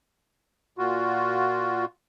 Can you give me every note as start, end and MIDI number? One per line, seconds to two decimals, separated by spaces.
0.78 1.85 46
0.78 1.85 65
0.78 1.85 66